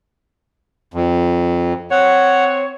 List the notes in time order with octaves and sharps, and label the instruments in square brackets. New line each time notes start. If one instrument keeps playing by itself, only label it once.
[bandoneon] F2
[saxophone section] C4 C#5 [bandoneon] F#5